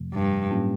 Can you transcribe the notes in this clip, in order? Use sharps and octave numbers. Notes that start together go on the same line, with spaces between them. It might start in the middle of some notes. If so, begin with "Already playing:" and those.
Already playing: F2 C3 F3 A3
G2
A2 F#3 A#3 C#4 F4